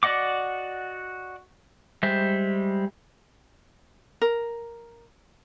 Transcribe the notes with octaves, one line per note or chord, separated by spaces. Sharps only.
F#4 D5 D#5 F#5 D6
G3 G#3 C5 E5
A#4